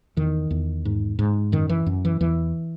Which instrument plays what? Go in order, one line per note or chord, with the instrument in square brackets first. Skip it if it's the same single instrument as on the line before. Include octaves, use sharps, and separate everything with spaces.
[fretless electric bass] E2 D#3
E2
G#2
G#2
F#2 D#3
E3
F#2
E3
E2 E3